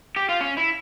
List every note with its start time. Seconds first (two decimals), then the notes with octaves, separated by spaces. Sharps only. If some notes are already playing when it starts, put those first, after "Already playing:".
0.16 G4
0.29 F4
0.41 C#4
0.57 E4